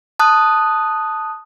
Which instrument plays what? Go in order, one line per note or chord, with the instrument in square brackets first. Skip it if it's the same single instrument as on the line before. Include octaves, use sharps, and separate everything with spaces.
[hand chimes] A5 D#6 F#6